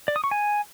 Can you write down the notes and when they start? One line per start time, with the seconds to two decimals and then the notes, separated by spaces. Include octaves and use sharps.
0.08 D5
0.16 D#6
0.24 C#6
0.31 G#5